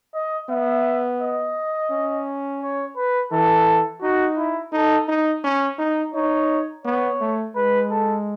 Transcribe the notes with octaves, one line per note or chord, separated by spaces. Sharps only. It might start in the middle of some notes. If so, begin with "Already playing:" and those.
D#5
B3 E5
D#5
C#4
C#5
B4
E3 A4
D#4 F#4
E4
D#4 A4
D#4
C#4
D#4
D#4 C#5
B3 C#5
A3
G#3 B4
A4